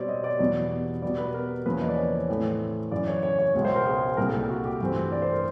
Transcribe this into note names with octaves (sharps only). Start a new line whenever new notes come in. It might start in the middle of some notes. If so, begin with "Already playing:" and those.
Already playing: B2 G3 C4 C#5 D5
D#5
D5
E2 B2 G3 B3 D5
B2 G3 B3 D5
B4
A#4
E2 C#3 F3 A#3 C#4 B4
D#5
D5
C#5
A2 E3 A3 C4
F#2 C#3 E3 D5
C#5
C#5
C#5
C#2 B2 G#3 C#5
C5
A#4
G#4
C2 A#2 G3 A#4
A4
G4
F#4
G4
G2 E3 A3 C4
D5
C5
A#4